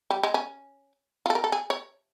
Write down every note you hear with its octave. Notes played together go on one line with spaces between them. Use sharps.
G3
G#3
C#4
F4
A4
A#4
A4
G#4
C#5